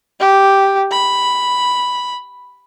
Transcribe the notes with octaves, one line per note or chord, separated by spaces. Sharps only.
G4
B5